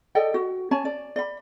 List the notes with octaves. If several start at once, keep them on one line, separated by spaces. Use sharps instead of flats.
A4 D5 D#5 G5
F#4
C#4 C#5 G#5 A5
D5
D5 B5